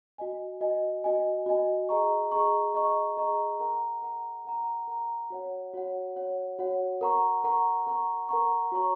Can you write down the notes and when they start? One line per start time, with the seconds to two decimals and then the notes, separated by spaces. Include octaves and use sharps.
0.18 F#4 D#5 G#5
0.61 F#4 D#5 G#5
1.04 F#4 D#5 G#5
1.46 F#4 D#5 G#5
1.89 G#4 D#5 A#5 C#6
2.32 G#4 D#5 A#5 C#6
2.74 G#4 D#5 A#5 C#6
3.17 G#4 D#5 A#5 C#6
3.60 A#4 F#5 A#5
4.02 A#4 F#5 A#5
4.45 A#4 F#5 A#5
4.87 A#4 F#5 A#5
5.30 F#4 C#5 F#5
5.74 F#4 C#5 F#5
6.16 F#4 C#5 F#5
6.59 F#4 C#5 F#5
7.01 A#4 F#5 A#5 C#6
7.44 A#4 F#5 A#5 C#6
7.87 A#4 F#5 A#5 C#6
8.29 A#4 F#5 A#5 C#6
8.72 F#4 A#4 C#5 A#5 C#6